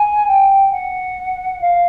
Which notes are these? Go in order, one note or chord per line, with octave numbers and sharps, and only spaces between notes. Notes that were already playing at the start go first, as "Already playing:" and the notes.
Already playing: G#5
G5
F#5
F5